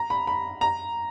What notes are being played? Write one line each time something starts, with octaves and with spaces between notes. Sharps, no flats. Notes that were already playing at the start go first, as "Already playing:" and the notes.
Already playing: A#5
B5
B5
A#5